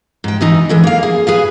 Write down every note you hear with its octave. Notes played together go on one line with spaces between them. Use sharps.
G#2 G5
E2 E3 D#4
D3 E3 G#3
A#3 F5
G#4
G#4 B4 F5